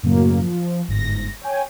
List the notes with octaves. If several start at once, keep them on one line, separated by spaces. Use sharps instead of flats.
F#2 A2 C#3 F#3 A#3
F3
G1 G#2 A#6
C#5 G5 G#5